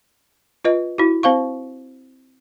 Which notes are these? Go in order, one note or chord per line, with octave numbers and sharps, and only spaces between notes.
F4 B4 D#5
E4 F#4
C4 C5 F5 C#6